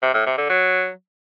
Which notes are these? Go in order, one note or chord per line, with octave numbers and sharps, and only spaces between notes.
C3
A2
C3
D3
F#3